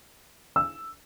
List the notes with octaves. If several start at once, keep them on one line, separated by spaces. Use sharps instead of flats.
E6